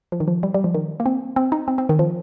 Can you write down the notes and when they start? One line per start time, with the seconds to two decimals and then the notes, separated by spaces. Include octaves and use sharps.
0.12 F3
0.20 D#3
0.28 F3
0.43 G3
0.54 G3
0.64 F3
0.74 D#3
1.00 A#3
1.06 C4
1.36 C4
1.52 D#4
1.68 C4
1.78 C4
1.89 D#3
1.99 F3